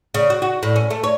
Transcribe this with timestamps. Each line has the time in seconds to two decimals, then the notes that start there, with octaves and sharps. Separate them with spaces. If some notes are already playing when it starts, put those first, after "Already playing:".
0.14 C#3
0.30 F#4
0.42 F#4
0.63 A2
0.76 C#4
0.90 A3
1.04 C#5